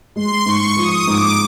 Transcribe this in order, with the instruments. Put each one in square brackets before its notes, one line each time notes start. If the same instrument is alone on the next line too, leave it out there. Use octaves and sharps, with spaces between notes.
[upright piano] G#3 [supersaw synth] C6
[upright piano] G#2 [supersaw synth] C#6
[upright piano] F3 [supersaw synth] D#6
[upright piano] G#2 [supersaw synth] D6